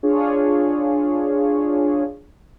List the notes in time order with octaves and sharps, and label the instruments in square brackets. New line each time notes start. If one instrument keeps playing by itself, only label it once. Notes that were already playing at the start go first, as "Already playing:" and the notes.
[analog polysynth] D4 F4 G#4 C#5